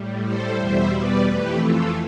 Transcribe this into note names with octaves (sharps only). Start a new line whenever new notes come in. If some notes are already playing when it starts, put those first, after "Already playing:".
Already playing: A2 G3
A4 C5
E2 B2 G3 C5 E5
B4 D5
F2 E3 A3 G4 B4
F4 A4